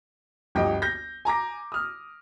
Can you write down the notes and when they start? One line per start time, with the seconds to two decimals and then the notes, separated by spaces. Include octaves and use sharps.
0.55 G1 D2 F3 G4 D#5 G5
0.82 G6 A#6
1.25 G#5 A#5 D6 A#6
1.72 D#6 F6